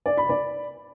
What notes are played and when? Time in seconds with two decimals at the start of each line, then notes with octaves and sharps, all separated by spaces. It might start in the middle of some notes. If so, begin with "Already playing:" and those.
0.06 D5
0.17 B5
0.29 D5